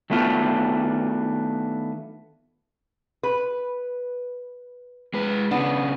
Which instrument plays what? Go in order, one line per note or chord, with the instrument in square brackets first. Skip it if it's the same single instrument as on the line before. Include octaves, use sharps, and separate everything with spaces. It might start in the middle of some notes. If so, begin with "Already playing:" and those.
[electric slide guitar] D#3 F#3 A3 B3 D4 F4
[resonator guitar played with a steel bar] B4
[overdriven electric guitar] G#3 B4
[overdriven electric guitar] C#3 D4 [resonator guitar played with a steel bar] B3